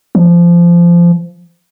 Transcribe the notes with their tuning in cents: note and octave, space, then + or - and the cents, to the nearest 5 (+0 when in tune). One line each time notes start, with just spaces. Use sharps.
F3 -20